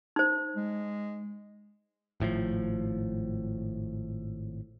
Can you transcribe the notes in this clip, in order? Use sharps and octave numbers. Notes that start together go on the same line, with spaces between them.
D#4 C5
G#3
G#1 A2 D3 F3